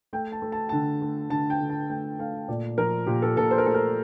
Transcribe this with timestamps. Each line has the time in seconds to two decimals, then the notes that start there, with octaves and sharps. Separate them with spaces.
0.13 A3 G5
0.32 A5
0.42 A3
0.52 A5
0.69 D3 A5
1.02 A3
1.30 D3 A5
1.50 G5
1.60 D3
1.70 A5
1.90 A3 G5
2.19 A3 F5
2.48 A#2 D5
2.77 F3 A#4
3.06 A#2 G4
3.22 A4
3.37 A#2 A4
3.51 C5
3.58 A#4
3.65 A3 A4
3.74 A#4